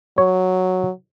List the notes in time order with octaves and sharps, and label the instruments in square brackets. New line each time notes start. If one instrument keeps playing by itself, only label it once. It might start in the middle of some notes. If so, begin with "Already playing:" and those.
[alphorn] F#3 [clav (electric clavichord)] C#5